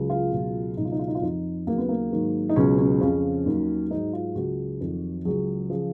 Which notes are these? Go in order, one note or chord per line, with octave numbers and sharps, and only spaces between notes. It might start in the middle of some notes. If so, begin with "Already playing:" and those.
Already playing: C#2 C#3 F#3
F4
C#2 B2 F#3
C#2 B2 F#3 D#4
F4
D#4
F4
D#4
F4
F2 F3 D#4
D#2 C#3 F#3 A#3
B3
A#3
G#2 D#3 F#3
D#4
C#2 B2 F#3 C#4
C#4
F2 C#3 F3 C#4
D#2 D#3 F#3
G#2 F#3 D#4
F4
C#2 C#3 F#3 F#4
F2 D#3 F#3
C#2 C#3 F#3 G#4
C#3 F3